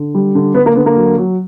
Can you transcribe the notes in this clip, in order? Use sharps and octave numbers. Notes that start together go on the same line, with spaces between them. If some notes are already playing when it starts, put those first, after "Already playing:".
Already playing: D3
G3
D3
D3 B3
A#3
D3 B3
A#3
F#3
F#3